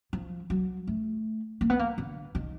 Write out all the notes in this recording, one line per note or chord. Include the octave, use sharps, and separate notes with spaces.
F3
F#3
A3
A#3
B3
A#3
D3
D#3